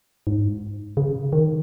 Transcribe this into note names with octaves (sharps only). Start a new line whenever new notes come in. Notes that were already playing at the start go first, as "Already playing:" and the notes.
G#2
C#3
D#3